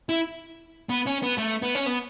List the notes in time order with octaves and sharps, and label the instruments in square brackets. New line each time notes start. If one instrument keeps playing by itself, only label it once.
[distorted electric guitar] E4
B3
C#4
B3
A3
B3
C#4
B3